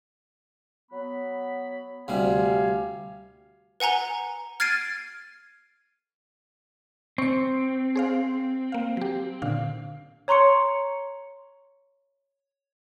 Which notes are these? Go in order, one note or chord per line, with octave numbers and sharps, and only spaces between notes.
F#3 B3 B5
D2 C3 G3 G4 F5 G#5
B4 F#5 G#5 A#5 G7
F6 G#6 A6 C7 D7 D#7
C4 C#6 C#7
G#4 C5 F5
A#3 F5
F#3 G4
A#2 D3 F5
C#5 A#5 C6 C#6 C#7